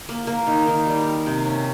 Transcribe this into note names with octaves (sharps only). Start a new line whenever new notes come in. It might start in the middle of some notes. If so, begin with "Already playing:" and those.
A#3
A#3
D#3
D#3
G3
A#4
C3
C#4